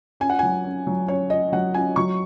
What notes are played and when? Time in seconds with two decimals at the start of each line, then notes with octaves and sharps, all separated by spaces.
0.20 C#4 G#5
0.29 F#5
0.39 F#3 G#5
0.64 C#4
0.87 F#3
1.08 C#4 C#5
1.30 C#4 D#5
1.52 F#3 F#5
1.74 C#4 G#5
1.96 F#3 C#6